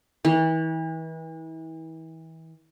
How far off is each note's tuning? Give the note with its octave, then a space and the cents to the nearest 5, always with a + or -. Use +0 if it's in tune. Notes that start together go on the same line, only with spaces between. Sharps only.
E3 -35